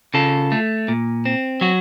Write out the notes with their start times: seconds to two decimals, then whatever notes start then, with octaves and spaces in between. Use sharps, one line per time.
0.14 C#3 F4 A4
0.52 A3
0.88 A#2
1.25 C4
1.61 F#3 F#4